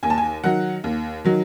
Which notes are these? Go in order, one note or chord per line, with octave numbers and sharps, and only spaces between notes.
D#2 G#5
A5
G#5
D#3 F#3 F#5
D#2
D#3 F#3